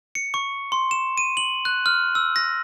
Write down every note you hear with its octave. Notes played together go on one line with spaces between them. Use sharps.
C#7
C#6
C6
E7
D#7
F#7
F#6
F6
E6
A#6